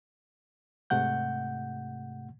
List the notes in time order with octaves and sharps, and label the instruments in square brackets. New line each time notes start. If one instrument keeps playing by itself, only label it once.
[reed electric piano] G#2 C3 A3 F#5 G6